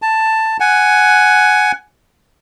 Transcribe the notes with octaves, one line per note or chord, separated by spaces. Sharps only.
A5
F#5 G#5